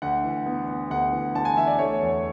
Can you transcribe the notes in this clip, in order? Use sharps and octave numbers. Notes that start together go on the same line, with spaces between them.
D2 F#5
E3
B3
B3
D2 F#5
E3
D2 A5
G#5
E3 E5
D5
A3 C#5
E2